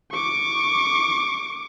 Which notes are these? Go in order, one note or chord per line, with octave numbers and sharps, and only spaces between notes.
C#6 D6